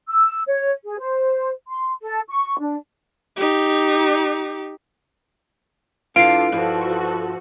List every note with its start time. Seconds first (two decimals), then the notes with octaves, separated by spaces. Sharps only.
0.08 E6
0.47 C#5
0.84 G#4
0.99 C5
1.68 C6
2.01 A4
2.29 C#6
2.60 D4
3.36 D#4 G4
6.16 D4 E4 F4 A4 B4 F5 C7 D7
6.52 G2 F3 F#4 A4